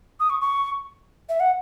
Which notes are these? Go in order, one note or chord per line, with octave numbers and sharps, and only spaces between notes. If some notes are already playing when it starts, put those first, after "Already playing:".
D#6
C#6
C#6
E5
F#5